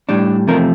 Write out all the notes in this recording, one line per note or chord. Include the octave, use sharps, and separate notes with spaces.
A2 G3 D4
E2 C3 F3 A3 A#4